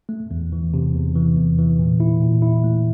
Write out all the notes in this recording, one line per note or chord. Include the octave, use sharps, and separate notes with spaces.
A3
E2
E3
C3
E2
E3
E2
E3
A#2
E4
A#2
E4
A3